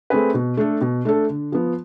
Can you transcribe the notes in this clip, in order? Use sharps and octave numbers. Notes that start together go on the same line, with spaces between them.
A3 C4 G#4 B4
B2
A3 D4 A4
B2
A3 D4 A4
D3
F3 B3